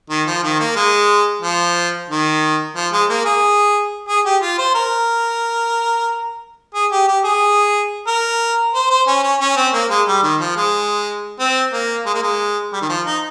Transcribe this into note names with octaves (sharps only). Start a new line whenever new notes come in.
D#3
F3
D#3
A#3
G#3
F3
D#3
F3
G#3
A#3
G#4
G#4
G4
F4
C5
A#4
G#4
G4
G4
G#4
A#4
C5
C5
C#4
C#4
C#4
C4
A#3
G#3
G3
D#3
F3
G#3
C4
A#3
G#3
A#3
G#3
G3
D#3
F3
D#4